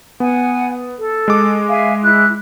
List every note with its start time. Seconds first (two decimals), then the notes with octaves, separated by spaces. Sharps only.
0.20 B3 F#5 G#5
0.99 A4
1.28 G#3 D6
1.69 E5 F5 G#5
2.01 E4 F#6